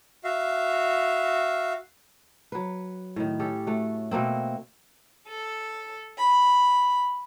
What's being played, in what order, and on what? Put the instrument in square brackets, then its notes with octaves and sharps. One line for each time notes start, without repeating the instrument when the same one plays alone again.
[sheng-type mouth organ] F#4 E5 F5
[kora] F#3 B4
A2 D#3
C#4 G4 A4
A3 F#4
B2 A3 A#3 C4
[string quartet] A4
B5